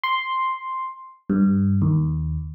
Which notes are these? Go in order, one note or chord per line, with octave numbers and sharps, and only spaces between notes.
C6
G2
D#2